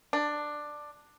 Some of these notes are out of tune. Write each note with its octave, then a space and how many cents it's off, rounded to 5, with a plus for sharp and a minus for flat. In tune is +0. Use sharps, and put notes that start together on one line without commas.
D4 +10